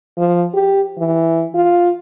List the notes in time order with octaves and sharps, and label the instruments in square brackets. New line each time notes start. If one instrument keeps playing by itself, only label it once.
[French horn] F3
G4
E3
F4